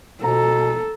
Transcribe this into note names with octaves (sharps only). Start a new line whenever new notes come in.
B2 A4 A#5